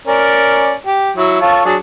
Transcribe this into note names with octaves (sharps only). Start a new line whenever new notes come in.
C#4 A#4 D5
G4
F#3 E4
F4 A4 C#5
F#3 D4 G#4